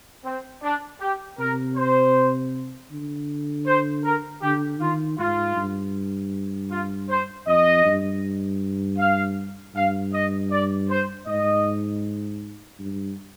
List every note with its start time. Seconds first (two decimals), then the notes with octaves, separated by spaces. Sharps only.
0.24 C4
0.62 D4
1.01 G4
1.39 C3 A#4
1.77 C5
2.91 D3
3.66 C5
4.04 A#4
4.42 D3 G4
4.80 D#3 F4
5.18 G#2 F4
5.56 G2
6.71 F4
7.09 C5
7.46 F2 D#5
7.85 G2
8.99 F5
9.75 G2 F5
10.12 D#5
10.51 D5
10.90 C5
11.27 G#2 D#5
12.79 G2